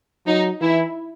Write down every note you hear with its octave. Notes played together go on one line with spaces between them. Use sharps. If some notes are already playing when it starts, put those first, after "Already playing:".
F#3 D#4
E3 E4